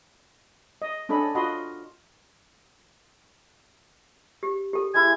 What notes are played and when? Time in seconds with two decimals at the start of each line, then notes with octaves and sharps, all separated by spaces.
0.82 D#5
1.09 C#4 D4 A4 D#5 B5
1.35 F4 F#4 D#5 B5 C6
4.43 G4
4.73 G4 A4
4.94 G#3 E4 G#6